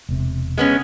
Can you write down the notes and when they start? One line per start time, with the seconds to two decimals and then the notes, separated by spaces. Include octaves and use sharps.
0.09 E1 C3
0.58 G#3 B3 C#4